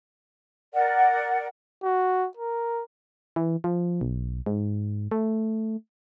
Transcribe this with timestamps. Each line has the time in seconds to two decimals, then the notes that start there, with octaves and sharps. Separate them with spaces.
0.74 A#4 D5 F#5
1.83 F#4
2.37 A#4
3.36 E3
3.64 F3
4.01 B1
4.46 G#2
5.11 A3